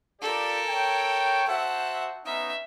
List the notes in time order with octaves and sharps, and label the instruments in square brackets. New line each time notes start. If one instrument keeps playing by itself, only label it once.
[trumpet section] F4 G4 D5 [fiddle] A4 A#4
[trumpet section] C#5 G5
[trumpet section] F#4 C5 E5 [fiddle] F#5 A5
[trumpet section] B3 C#4 D#4 [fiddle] E5